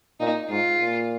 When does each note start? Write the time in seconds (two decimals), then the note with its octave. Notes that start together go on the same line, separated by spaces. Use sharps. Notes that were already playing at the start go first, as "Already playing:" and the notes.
0.20 A#2 D#4
0.49 G#2 F4
0.80 A#2